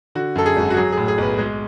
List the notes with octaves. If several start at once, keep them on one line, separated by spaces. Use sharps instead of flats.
D3 F#4
F#2 A4
G#4
G#1
F#4
F#3 G#4
A2 G#4
G#4
B1 B4
G#3